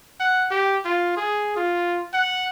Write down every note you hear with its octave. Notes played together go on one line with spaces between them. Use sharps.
F#5
G4
F4
G#4
F4
F#5